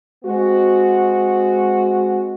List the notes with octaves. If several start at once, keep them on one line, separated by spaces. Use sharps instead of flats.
G#3 C4 F#4